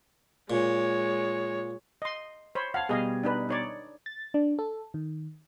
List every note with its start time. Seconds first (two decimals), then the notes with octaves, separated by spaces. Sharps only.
0.50 A#2 G#3 C#5
2.02 D#5 C6
2.55 C5 C#5 B5
2.74 F5 F#5 A5 G#6
2.89 B2 G3 G#4 D#5 F5
3.23 D4 D#4 B4
3.49 D#4 C#5 D5
4.06 A6
4.34 D4
4.59 A4
4.94 D#3